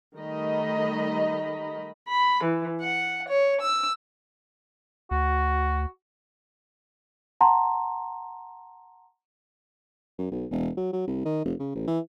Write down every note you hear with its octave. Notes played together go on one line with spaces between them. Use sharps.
D#3 G3 A3 D#5 A#5 B5
B5
E3
F#5
C#5
E6
D2 F#4
F#5 A5 A#5 C6
F#2
B1
E1
F#3
F#3
C2
D#3
F1
C#3
A1
E3